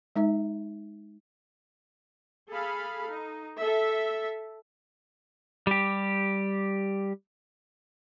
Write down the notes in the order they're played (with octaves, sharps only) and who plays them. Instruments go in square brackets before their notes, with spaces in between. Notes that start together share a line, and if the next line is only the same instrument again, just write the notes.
[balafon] G#3 D#4 E5
[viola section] G#4 A4 F5 B5
D#4
A4 E5
[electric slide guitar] G3 G4